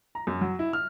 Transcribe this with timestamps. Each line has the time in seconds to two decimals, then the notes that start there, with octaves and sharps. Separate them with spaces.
0.15 A#5
0.27 F#2
0.41 F#3
0.59 E4
0.73 F6